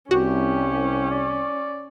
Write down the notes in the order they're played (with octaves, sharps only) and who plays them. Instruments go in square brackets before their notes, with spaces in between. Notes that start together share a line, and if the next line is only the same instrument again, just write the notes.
[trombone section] C2 [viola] C#4 [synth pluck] F#4 [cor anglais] G4
[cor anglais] D5